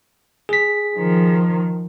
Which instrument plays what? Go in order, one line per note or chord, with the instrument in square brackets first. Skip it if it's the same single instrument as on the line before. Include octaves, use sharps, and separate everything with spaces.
[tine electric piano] G#4 B6
[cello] D#3 F3